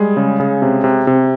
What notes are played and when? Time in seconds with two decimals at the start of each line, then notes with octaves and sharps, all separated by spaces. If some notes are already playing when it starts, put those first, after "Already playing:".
Already playing: G3 G#3 G#4
0.17 C#3
0.40 C#3
0.62 C3
0.84 C3
1.07 C3